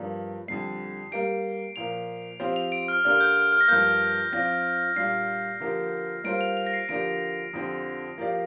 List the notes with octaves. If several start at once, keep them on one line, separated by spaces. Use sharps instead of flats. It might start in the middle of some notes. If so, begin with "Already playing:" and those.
Already playing: G2 F3 A#3 D4
F2 D3 G3 C7
G3 A#3 G4 D7
A#2 F3 A#3 F7
F3 C4 G4 C5 F5
F7
D7
F6
D3 A#3 D4 G4 D5 F6
G6
F6
F6
A#6
G2 F3 A#3 G6
F3 C4 F4 D5 A#6
A#2 G3 D4 F4 C7
D3 F3 A#3 G4
G3 A#3 F4 C5 D7
F7
F7
A#6
C7
D3 F3 A#3 D4 G4 D7
F2 D3 F3 C4 G4
F3 A#3 G4 D5 F5